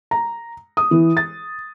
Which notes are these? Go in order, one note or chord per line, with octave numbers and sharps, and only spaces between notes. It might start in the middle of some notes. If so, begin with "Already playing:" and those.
A#5
D#6
E3
A6